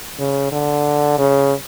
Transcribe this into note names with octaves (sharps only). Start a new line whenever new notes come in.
C#3
D3
C#3